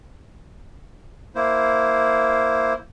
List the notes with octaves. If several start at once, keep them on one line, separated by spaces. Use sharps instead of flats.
A#3 E4 C5